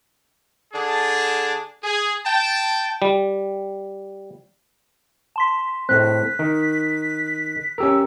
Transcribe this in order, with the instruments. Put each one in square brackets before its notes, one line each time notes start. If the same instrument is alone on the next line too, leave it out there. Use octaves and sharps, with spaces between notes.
[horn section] D3 D4 G#4 A5
G#4
G5 A5
[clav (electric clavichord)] G3
[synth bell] A5 C6 B6
[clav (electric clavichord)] A2 C4 [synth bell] F#6 [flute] B6
[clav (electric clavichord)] D#3
[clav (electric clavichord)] C#4 G4 A#4 [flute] E6